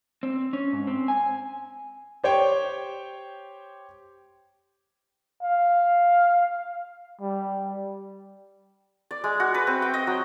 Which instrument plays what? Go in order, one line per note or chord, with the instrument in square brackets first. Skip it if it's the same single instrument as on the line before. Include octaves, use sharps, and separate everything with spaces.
[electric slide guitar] C4
C#4
G#2
C4
G#5
[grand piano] G4 C5 C#5 G5
[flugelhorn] F5
G3
[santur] D5
G#3
F#4
B4
C4
G5
D#5
F#3